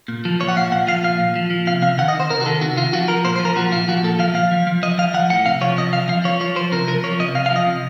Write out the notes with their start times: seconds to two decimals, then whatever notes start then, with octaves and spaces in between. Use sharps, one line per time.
0.08 A#2
0.25 F3
0.40 F3 C#5
0.48 F#5
0.56 A#2 F5
0.71 A#2 F#5
0.87 F3 F5
1.04 A#2 F5
1.20 A#2
1.36 F3
1.50 F3
1.67 C3 F5
1.82 C3 F5
1.98 D#3 F#5
2.08 D#5
2.14 D#3
2.20 C5
2.30 C3 A#4
2.41 F#4
2.46 D#3 A4
2.61 C3 F#4
2.77 D#3 F4
2.93 F3 F#4
3.08 F3 A#4
3.25 A#2 C5
3.36 C5
3.40 F3
3.45 A#4
3.56 F3 F#4
3.72 A#2 F4
3.88 F3 F#4
4.04 A#2 A4
4.19 F3 F5
4.34 F3 F5
4.52 F3
4.67 F3
4.83 F3 D#5
4.98 F3 F5
5.14 F3 F#5
5.30 A2 F#5
5.46 C3 F5
5.61 F3 C#5
5.77 C3 D#5
5.93 F3 F5
6.09 F3 F5
6.24 F3 C#5
6.40 F3 C#5
6.56 F3 C5
6.72 C3 A#4
6.88 F3 A#4
7.04 F3 C#5
7.20 C3 D#5
7.35 C3 F5
7.46 F5
7.51 F3 D#5
7.66 C3